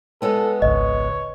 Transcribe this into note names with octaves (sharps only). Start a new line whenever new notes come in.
G#3 B3 A4
G#1 C#2 C#5 D#5